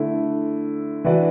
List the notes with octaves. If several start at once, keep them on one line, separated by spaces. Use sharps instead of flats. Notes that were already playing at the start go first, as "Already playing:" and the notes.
Already playing: D3 A3 E4
E3 D4 F#4 B4 D5